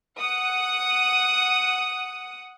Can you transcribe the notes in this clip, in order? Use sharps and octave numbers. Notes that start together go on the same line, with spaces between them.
F#5 D#6